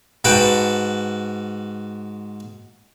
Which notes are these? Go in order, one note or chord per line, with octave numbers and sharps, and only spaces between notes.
G#2 F#4 B4 G5 A5